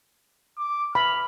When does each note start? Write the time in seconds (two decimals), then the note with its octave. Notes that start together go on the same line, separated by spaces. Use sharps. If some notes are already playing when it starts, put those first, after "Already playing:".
0.58 D6
0.95 B5 F6